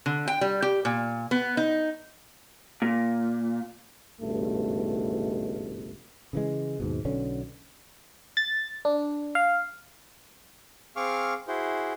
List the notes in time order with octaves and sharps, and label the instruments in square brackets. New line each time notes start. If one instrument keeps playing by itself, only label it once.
[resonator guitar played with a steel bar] D3
G5
G3
G4
A#2
B3
D#4
[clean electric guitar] A#2
[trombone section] G#1 C#2 G2 B2 A3
[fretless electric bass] C#3 E3 G#3
D#2 G#2 B2
B1 B2 D3 C#4
[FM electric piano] A6
D4
F5
[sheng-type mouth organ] C4 G#4 F5 C#6 D6 F6
E4 F#4 G#4 C5